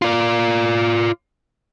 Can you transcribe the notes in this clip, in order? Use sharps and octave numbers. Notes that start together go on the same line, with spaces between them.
F4 D5